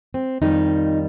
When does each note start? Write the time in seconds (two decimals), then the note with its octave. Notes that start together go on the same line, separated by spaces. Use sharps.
0.14 C4
0.42 F2 D#3 G3 D#4